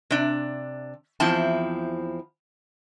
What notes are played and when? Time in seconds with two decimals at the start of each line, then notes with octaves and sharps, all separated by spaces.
0.11 C3 D4
1.20 E2 F3 C4 E4 A5